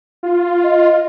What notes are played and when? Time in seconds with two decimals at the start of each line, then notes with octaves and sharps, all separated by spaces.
0.23 F4
0.63 D#5